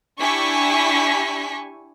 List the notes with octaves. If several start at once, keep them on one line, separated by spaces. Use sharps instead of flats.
D4 E4 G4 G#5 C#6 B6